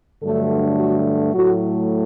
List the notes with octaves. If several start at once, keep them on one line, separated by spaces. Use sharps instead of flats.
G2 D3 F#3 A3 A4
F#4
A2 F#3 A3 F#4